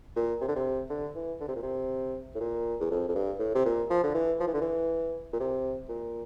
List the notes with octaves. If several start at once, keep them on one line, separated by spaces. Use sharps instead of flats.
A#2
C3
D3
C3
D3
E3
D3
C3
A#2
C3
A2
A#2
E2
F2
F2
G2
A2
C3
A#2
F3
D3
E3
F3
E3
D3
E3
A#2
C3
A#2